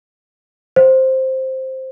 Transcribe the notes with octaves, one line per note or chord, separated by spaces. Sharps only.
C5